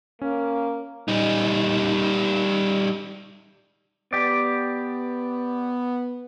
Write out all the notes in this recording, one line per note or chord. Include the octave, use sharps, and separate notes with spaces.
A#3 C#4
G3 D#4
B3 G4 D5